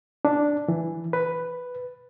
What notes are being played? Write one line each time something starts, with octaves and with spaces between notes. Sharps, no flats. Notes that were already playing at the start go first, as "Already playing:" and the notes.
D4
E3
B4